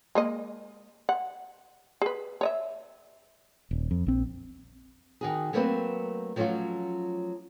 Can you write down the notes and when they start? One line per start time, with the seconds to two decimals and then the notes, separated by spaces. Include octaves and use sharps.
0.15 G#3 A#3 D#5
1.09 F#5
2.02 G#4 B4
2.41 C#5 D#5 E5
3.71 D#1
3.91 F2
4.06 A#1 C4
5.21 D#3 F#4 G#4
5.53 F#3 A3 A#3 C4 B4 C5
6.36 F3 F#3 A3 C#4 F4 F#4